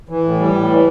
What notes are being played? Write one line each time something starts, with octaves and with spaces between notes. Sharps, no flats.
E3
A2
G3
A2
E3